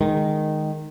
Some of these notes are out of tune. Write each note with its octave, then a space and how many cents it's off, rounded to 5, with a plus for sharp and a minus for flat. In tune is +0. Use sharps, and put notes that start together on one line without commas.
D#3 -10 G#3 +0